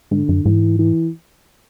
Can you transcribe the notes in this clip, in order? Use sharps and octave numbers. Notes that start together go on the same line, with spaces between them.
G#2 D3
F#2
G#2 E3
E3